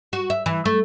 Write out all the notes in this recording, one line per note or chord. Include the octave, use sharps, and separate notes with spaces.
F#4
E5
E3
A3